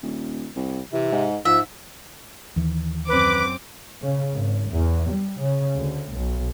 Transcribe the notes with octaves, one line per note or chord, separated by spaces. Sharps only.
D#1
C2
C3 E3
G#2
G#2 F3 E5
D#2 E3
F#2 C4 B4 D6
C#3
G#1
E2
G3
C#3
D2
B1